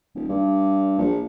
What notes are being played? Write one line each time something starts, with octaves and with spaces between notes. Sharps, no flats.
D#1
G2
A#1